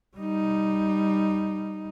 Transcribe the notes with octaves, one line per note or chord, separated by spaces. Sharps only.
G3 D#4